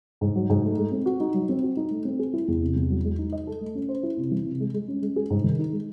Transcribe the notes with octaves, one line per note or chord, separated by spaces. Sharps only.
G#2
F#3
G#2
A3
G#3
C4
F#4
D#4
F#3
C4
F#4
D#4
A3
C4
G#4
E4
E2
C3
E2
F#3
G#3
D#4
D#5
A4
A3
C#4
C5
E4
C3
E3
C3
G#3
G#3
C#4
G#3
G#4
G#2
D#3
D#4
G#3